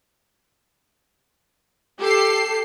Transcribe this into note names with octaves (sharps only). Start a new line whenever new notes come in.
G4 A4 C7